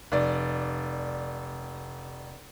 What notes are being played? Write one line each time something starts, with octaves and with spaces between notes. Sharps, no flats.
F1 D5